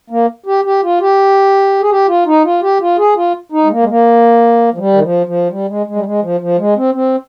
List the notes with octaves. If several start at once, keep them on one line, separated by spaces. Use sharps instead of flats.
A#3
G4
G4
F4
G4
G#4
G4
F4
D#4
F4
G4
F4
G#4
F4
D#4
G#3
A#3
G#3
A#3
F3
G3
D#3
F3
F3
G3
G#3
G#3
G3
G#3
F3
F3
G#3
C4
C4